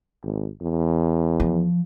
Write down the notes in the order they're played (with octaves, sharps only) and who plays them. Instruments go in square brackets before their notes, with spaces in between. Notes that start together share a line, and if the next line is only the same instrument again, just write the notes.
[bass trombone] G#1
E2
[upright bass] F3